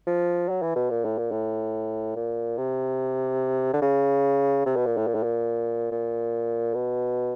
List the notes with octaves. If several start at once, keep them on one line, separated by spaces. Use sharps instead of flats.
F3
F#3
E3
B2
A#2
A2
A#2
A2
A#2
C3
D3
C#3
C3
B2
A#2
A2
A#2
A2
A#2
A#2
B2